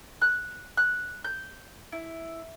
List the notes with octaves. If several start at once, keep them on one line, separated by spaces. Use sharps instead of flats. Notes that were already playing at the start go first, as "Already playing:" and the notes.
F#6
F#6
G6
E4